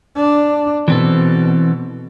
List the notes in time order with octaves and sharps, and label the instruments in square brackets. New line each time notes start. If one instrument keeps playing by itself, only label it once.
[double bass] D4
[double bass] B2 [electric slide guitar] E3 C4 A4